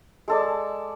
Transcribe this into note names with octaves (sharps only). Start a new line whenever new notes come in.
G#3 A4 D5